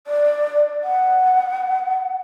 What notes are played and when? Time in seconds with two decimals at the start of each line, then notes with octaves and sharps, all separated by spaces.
0.07 D5
0.84 F#5